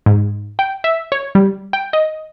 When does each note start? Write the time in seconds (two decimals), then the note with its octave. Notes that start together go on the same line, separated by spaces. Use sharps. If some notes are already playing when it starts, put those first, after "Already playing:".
0.06 G#2
0.59 G5
0.84 E5
1.12 C#5
1.35 G3
1.73 G5
1.93 D#5